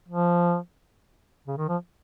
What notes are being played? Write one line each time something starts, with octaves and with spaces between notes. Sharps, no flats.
F3
C#3
D#3
F3